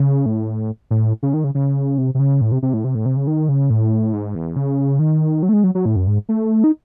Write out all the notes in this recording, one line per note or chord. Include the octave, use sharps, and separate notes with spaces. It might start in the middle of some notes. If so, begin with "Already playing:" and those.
Already playing: C#3
A2
A2
C#3
D#3
C#3
C#3
C3
C3
C#3
A2
C3
C3
A2
C3
A2
C3
C#3
D#3
C#3
A2
G#2
E2
C#3
D#3
F#3
A3
G#3
F#3
F#3
A2
F#2
G#2
A3
D#4